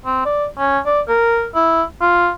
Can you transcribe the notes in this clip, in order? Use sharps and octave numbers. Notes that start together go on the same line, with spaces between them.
C4
D5
C#4
D5
A#4
E4
F4